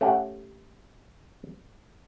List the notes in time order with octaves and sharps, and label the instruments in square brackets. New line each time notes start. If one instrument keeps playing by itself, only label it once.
[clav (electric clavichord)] A3 C#4 G4 F5 F#5